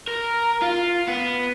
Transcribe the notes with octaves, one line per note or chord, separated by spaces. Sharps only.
A#4
F4
B3